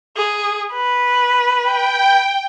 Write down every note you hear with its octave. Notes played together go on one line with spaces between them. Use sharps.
G#4
B4
G5